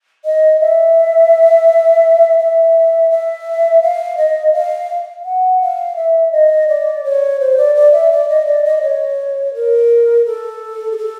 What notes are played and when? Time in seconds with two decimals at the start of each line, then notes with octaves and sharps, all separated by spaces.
0.25 D#5
0.60 E5
2.39 E5
3.10 E5
3.82 F5
4.17 D#5
4.53 F5
5.24 F#5
5.61 F5
5.96 E5
6.32 D#5
6.68 D5
7.04 C#5
7.40 C5
7.57 D5
7.75 D5
7.92 E5
8.11 D5
8.29 D#5
8.46 D5
8.64 D#5
8.82 C#5
9.54 A#4
10.25 A4
10.91 G#4
10.97 A4